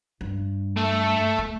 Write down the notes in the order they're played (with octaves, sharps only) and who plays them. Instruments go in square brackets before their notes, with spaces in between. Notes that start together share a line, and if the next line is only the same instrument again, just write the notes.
[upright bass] G2
[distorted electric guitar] A3 A4
[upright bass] A3